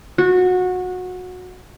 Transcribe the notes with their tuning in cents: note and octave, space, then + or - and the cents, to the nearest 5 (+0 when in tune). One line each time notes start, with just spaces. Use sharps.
F#4 -20